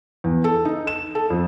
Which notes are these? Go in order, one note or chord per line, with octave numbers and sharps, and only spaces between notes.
E2
A4
D#4
E7
A4
F2